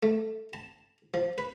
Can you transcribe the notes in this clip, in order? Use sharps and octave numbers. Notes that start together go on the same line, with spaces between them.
A3
A5
F3
B4